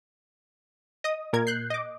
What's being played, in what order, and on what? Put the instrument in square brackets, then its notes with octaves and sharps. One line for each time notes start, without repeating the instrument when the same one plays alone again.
[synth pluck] D#5 D#6
A#2 A#4 G#6
F#6 G6 C7
D#5 D6